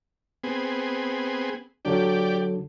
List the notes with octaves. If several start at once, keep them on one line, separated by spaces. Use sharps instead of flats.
B3 C4 G#4
D3 F#3 D4 G4 D5